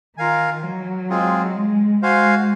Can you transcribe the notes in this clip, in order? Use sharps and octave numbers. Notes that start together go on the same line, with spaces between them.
D#3 F4 A#4 F5 G#5
F#3
G#3 C4 F4 G#4
G#3
G#3 F#4 C5 F5 G#5